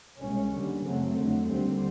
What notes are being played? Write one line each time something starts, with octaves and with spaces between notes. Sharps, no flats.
C2 B2 G#3 C#4
D#2 D3 G3
F#2 C#3 F#3 A3 C4
F2 D3 F#3
D#2 D3 G3 C4